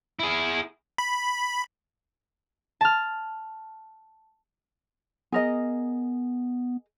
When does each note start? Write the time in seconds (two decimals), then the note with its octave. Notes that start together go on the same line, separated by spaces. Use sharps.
0.19 E4 G#4
0.98 B5
2.81 A5 F6
5.32 B3 G#4 A#4 D#5